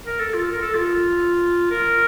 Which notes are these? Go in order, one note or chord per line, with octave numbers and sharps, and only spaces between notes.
A#4
A4
F4
A#4
A4
F4
A#4